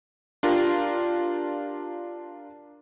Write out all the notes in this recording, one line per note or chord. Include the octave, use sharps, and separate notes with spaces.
D4 F4 G4 A#4